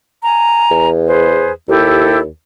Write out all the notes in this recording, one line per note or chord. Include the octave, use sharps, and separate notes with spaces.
G#5 A#5
E2
G#4 B4 C5
D#2 E4 G4 A4